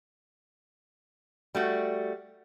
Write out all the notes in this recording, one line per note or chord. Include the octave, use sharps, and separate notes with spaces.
G3 A3 F#4